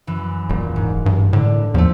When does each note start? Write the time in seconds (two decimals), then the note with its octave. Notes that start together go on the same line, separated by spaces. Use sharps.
0.07 F#2 E3
0.49 D#1 A#2
0.76 G#2
1.06 G2
1.33 A2 D3
1.74 E2 F3 A3